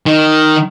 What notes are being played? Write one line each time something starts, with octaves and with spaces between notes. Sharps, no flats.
D#3